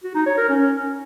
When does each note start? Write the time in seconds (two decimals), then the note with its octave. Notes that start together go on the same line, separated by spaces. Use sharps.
0.04 F#4
0.15 D#4
0.26 C#5
0.37 A#4
0.49 C#4